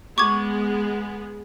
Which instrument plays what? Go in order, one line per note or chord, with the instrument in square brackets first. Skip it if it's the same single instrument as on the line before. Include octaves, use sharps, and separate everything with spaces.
[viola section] G#3 B3 G#4 [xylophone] C#6 D6 G#6